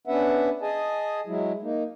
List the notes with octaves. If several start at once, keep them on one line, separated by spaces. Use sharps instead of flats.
B3 C#4 D4 B4 E5 F#5
G#4 D#5 G#5 A5
F#3 G#3 E4
A#3 D#4